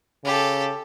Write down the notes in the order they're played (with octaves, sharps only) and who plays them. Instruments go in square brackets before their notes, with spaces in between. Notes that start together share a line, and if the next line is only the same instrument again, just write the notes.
[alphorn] C#3 [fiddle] G4 A4